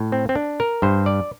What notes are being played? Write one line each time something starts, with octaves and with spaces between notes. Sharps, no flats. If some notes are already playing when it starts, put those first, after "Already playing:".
Already playing: A2
C4
C4
D4
A#4
G2 C5
D5